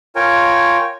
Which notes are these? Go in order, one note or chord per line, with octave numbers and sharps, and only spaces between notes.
F4 A#4 C#5 G5 G#5